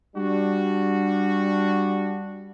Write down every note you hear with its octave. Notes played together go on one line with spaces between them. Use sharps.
G3 D4 F#4